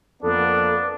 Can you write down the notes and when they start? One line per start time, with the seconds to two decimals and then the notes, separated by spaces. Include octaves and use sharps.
0.22 F2 A#3 B3 D4 A4